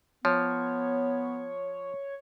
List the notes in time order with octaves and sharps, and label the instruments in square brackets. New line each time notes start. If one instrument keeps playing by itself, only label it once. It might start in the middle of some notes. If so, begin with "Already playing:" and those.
[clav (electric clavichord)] F3 [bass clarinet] B3 [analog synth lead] C#5